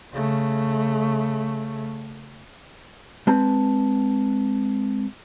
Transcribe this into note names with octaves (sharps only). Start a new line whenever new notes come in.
C#3 A3
G#3 C4 B4 A5